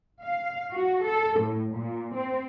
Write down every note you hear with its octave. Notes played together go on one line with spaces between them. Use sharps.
F5
F#4
A4
A2
A#2
C4